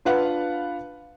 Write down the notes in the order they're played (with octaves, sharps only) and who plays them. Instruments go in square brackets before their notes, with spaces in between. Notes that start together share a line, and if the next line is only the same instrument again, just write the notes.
[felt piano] D4 F4 B4 F5 F#5